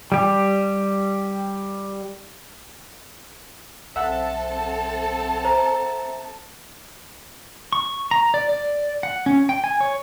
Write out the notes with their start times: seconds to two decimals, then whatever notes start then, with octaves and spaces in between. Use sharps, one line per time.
0.12 G3 G4
3.96 B1 C4 A4 E5 F#5 A5
5.45 C5 A#5
7.73 C#6
8.11 A#5
8.34 D5
8.49 D5
9.03 F#5
9.26 C#4
9.49 G5
9.64 G#5
9.81 C#5